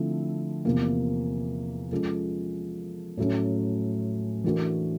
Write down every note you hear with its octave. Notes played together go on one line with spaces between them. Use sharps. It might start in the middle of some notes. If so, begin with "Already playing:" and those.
Already playing: D3 F3 A3 C4 E4
E2 C3 F3 A#3
F3 G#3 C#4 F4 A4
A2 F#3 A3 C#4
E3 A3 D4 F#4 A#4